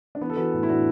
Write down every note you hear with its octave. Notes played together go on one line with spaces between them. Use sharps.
D4
E3 B3
A4
E3 F#4 B4
A2
E4
A2 D4 F#4